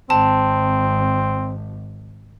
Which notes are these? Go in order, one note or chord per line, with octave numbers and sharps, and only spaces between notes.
G#1 C4 A5